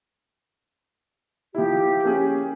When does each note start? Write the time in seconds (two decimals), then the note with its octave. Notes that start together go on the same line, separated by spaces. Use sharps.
1.55 F3 E4 G4
2.04 A#3 C#4 G#4